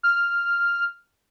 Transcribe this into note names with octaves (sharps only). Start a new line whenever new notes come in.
F6